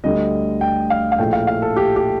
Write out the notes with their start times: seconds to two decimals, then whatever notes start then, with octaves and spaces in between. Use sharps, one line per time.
0.04 D2 D3 G3 D#5
0.61 G5
0.90 F5
1.12 F5
1.18 A#1 A2 A3 G5
1.33 F5
1.47 F5
1.62 A4
1.76 G4
1.96 G4